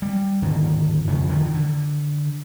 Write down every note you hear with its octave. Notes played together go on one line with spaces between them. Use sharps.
G3
D1 G#1 D#2 D3
F2 C#3 F3 A3
D3 D#3 F3
D3